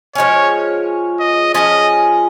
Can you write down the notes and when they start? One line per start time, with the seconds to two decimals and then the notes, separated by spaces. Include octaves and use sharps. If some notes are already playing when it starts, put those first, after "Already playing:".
0.15 F3 G#3 C#4 C#5
1.20 D#5
1.53 F3 C#4 G#4 D#5